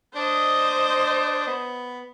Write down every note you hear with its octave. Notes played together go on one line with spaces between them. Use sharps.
D4 C5 D#5
B3